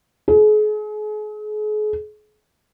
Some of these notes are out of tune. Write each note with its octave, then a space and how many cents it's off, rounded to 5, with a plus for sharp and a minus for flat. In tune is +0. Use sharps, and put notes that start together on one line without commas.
G#4 +40